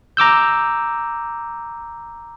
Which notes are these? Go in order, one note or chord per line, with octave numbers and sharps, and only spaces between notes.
A#5 D6 E6 G6